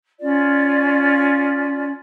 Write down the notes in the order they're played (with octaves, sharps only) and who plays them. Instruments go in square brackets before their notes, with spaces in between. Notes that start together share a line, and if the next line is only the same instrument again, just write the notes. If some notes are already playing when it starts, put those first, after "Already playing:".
[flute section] C#4 F4 D5